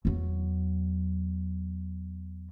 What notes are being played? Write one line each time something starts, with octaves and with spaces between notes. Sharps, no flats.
E2 F#3